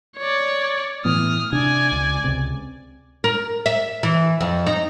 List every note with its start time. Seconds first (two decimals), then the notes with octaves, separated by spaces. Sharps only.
0.17 C#5 D5
1.05 A2 E3 B3 D#6 F6
1.52 C3 D4 D5 G#5
1.92 C#2
2.24 C#2 C3
3.24 A#4
3.66 E5
4.03 E3
4.41 F2
4.67 D#4